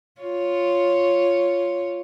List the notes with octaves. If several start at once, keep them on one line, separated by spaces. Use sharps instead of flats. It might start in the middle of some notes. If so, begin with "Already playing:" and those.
F4 C#5